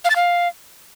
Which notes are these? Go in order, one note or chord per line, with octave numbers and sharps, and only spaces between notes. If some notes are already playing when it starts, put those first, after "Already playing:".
F5
A6
F5